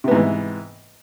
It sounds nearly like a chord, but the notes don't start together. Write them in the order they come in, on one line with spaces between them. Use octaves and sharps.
C3 B3 G#2 E3